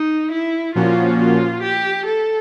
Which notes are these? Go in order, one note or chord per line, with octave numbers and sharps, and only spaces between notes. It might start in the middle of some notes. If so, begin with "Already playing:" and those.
Already playing: D#4
E4
A#2 F3 A#3 C#4 F4 F#4
F4
G4
A4